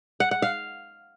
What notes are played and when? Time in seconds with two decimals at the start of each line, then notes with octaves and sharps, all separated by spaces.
0.20 F#5
0.31 F#5
0.42 F5